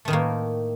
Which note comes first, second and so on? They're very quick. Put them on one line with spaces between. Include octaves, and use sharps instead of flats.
A3 D#3 A2 A#3